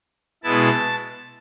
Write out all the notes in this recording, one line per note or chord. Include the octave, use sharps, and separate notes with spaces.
B2 G#3 B3 E4 A5